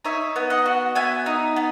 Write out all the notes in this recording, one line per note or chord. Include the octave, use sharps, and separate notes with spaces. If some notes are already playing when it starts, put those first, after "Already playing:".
D#4 C#5 E5
B3
D#5 F#5
F#4
B3 E5 G#5
D#4
B3